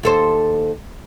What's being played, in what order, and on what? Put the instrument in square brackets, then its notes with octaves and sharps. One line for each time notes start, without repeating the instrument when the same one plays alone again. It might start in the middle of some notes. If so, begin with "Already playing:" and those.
[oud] D#2 A4 C5